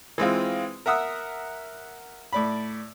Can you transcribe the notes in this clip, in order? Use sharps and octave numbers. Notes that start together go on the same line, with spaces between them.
E3 G#3 C4 F4
A#4 E5 F#5 D#6 E6
A2 D5 B5